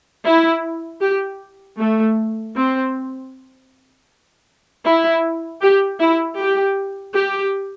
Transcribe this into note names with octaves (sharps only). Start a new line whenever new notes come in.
E4
G4
A3
C4
E4
G4
E4
G4
G4